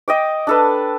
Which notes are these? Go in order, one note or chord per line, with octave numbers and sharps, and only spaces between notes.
D#5 G5 D6
D4 A4 B4